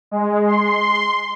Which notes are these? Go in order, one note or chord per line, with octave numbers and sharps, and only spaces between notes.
G#3
C6